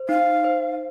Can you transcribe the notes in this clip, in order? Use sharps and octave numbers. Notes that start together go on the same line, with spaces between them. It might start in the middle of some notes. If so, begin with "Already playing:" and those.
Already playing: C5
D#4 F5
C5